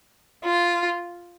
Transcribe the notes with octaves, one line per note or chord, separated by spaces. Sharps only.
F4